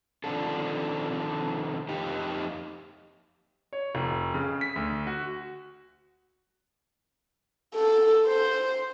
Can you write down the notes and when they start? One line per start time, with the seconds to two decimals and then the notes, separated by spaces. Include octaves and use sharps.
0.24 D#3 F3 C4 D4 A4
1.89 F2 D#4 G4
3.73 C#5
3.95 F1
4.34 C#3
4.61 B6
4.76 D2
5.07 F#4
7.75 A4
8.27 C5